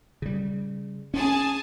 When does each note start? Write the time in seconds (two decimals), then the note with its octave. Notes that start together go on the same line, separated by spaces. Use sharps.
0.22 C#3 G3
1.14 C#4 G#4 G#5 A5